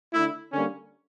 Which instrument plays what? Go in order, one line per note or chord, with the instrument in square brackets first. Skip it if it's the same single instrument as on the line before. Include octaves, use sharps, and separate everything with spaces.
[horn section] D3 A3 E4
D3 G3 A#3 C#4